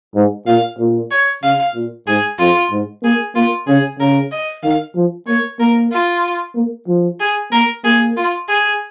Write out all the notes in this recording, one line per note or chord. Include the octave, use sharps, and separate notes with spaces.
G#2
A#2 F5
A#2
C#5
C#3 F5
A#2
G#2 G#4
F2 F4
G#2
A#3 G#4
A#3 F4
C#3 G#4
C#3 A#4
D#5
D#3 F5
F3
A#3 C#5
A#3 A#4
F4
A#3
F3
G#4
A#3 A#4
A#3 G#4
F4
G#4